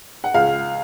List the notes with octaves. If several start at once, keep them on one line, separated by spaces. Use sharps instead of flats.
F#5
C#2 F5